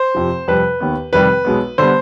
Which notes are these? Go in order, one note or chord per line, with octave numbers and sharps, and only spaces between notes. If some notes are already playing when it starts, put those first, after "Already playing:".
Already playing: C5
F1 F2 C3 F3
F2 C3 G3 B4
D#2 D#3 B3
F1 F2 C3 D#3 G3 B4
B1 B2 G#3 B3
D3 G3 B3 C5